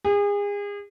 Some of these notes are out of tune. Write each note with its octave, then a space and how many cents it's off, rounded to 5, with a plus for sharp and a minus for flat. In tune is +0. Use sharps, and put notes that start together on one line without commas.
G#4 -35